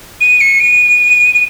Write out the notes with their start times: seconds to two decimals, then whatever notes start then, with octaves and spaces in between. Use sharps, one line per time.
0.21 D#7
0.41 C#7
0.61 D#7
1.34 D#7